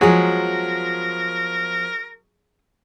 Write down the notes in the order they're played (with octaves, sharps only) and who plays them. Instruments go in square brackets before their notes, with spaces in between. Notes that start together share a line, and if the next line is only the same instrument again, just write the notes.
[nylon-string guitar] F3 B3 [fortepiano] F#3 G#3 [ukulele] G#4 [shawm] A#4